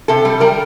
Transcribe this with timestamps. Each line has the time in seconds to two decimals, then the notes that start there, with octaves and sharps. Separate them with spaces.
0.08 C3 A4
0.25 G3
0.40 G3 A#4